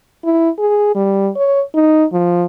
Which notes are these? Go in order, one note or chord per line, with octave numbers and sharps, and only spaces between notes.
E4
G#4
G3
C#5
D#4
F3